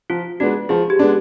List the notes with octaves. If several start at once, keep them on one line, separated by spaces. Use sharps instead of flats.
F3 F4
G#3 B3 D4 F#4
F3 G#4
G4
G#3 B3 D4